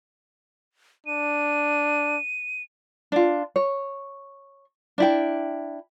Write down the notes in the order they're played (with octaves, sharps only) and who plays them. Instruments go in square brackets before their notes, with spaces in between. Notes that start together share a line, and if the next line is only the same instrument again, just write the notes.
[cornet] D4 [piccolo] D#7
[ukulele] D4 F4
C#5
D4 E4 G5